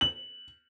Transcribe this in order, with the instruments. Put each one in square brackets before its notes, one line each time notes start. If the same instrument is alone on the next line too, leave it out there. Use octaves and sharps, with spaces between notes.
[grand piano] F#7